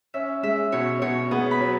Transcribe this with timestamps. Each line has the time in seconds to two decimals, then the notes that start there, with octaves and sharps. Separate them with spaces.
0.14 C#4 E5
0.43 G#3 E5
0.72 B2 C#5
1.02 B2 C#5
1.31 B3 G#4
1.51 B5
1.61 F#3